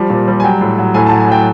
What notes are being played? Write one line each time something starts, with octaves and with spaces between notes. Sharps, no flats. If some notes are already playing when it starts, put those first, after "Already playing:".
Already playing: F3 G3
A#2
G3
G#5
F#3 G5
A2
F#3
A2 G#5
A5
F#3
G#5
F#3 G5